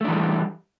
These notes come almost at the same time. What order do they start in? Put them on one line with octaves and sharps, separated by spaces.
A3 D4 E3 G3